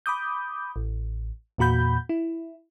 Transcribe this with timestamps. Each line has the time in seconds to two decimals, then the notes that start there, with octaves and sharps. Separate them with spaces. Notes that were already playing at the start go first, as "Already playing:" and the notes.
0.06 B5 D6 D#6 G6
0.76 A1
1.58 E2 A#2 F#4 B5 G6
2.09 E4